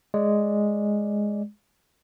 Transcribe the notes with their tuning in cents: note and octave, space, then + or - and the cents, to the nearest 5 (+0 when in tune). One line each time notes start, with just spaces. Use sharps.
G#3 +0 D5 +0